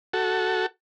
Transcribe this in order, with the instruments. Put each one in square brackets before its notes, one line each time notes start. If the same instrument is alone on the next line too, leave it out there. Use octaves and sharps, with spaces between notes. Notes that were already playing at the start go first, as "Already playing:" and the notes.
[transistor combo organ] F#4 A4